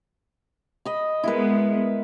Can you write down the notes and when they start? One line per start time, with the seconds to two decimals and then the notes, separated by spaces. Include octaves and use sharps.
0.85 D#5 B5
1.23 G#3 B3 E4 A#4 B4